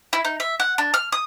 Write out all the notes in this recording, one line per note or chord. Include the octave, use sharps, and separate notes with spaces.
E4
D#4
E5
F#5
D4
F6
D#6